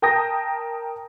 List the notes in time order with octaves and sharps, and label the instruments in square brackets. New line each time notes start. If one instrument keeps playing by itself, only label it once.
[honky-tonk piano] A#4 G5 A5 D#6 G6 A#6